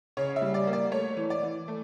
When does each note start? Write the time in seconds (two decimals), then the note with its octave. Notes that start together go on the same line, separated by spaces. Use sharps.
0.17 C#3 C#5
0.36 E5
0.42 G3
0.54 D5
0.67 A#3
0.73 D5
0.91 A3 C#5
1.17 E3
1.30 D5
1.43 E3
1.68 A3